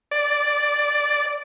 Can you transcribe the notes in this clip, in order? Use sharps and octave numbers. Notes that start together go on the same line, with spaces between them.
D5